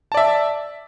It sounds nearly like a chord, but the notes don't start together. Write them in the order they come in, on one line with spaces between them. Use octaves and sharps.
A5 D5 E5